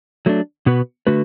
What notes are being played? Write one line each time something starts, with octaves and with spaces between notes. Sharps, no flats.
F#3 A3 D4
B2 B3 F#4 B4
D3 A3 F#4 B4